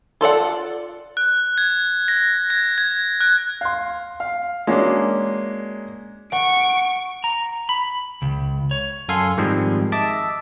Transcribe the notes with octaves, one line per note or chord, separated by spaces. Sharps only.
F4 A4 D5 F#5
F#6
G#6
A#6
G#6
G#6
F#6
F5 C6
F5
G#3 A#3 C#4 D4 F#4
F#5 C#6 D7
A#5
B5
C#2
C#5
F#2 A4 F5 G#5 C6
G#2 D#3 F3 G3 G#3 C4
D#5 E5 A5 D6 E6